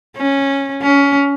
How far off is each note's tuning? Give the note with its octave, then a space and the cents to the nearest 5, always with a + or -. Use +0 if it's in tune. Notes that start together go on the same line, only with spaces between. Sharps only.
C#4 -10
C#4 +20